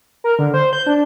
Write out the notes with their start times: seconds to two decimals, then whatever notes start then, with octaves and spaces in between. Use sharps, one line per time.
0.24 A#4
0.39 D3
0.54 C5
0.73 G6
0.87 D4